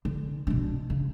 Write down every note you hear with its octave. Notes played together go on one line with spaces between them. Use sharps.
D3
B2 D4
C#3